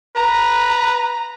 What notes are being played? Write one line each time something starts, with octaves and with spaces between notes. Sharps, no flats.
B4 A#5